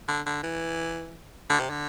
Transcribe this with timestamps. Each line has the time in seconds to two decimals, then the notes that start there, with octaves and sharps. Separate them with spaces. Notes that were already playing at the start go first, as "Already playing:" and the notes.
0.09 D3
0.26 D3
0.43 E3
1.50 D3
1.60 C3
1.70 D3